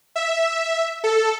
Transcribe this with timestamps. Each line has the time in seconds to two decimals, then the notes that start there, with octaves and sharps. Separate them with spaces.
0.16 E5
1.04 A4